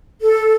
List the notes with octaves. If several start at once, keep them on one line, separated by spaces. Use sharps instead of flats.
A4